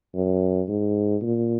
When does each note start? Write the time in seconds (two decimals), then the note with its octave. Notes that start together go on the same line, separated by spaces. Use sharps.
0.15 F#2
0.69 G#2
1.22 A#2